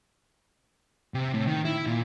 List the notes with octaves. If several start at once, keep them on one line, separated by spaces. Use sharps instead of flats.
C3
A2
D#3
E4
A#2